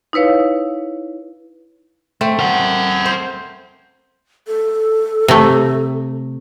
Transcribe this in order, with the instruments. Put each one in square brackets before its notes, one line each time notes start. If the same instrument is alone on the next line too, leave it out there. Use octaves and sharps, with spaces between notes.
[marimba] D#4 E4 B4 C#5 F5
[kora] A3 C4
[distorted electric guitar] A#4 F#5
[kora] C5
[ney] A4
[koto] C3 A3